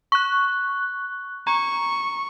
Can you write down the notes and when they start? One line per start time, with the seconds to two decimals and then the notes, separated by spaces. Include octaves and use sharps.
0.12 C#6 F#6
1.47 A#5 C#6